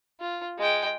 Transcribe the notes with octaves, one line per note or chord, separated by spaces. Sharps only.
F4
G#3 G5